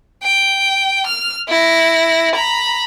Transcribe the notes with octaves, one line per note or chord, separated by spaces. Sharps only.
G5
F6
E4 A#6
A#5 B5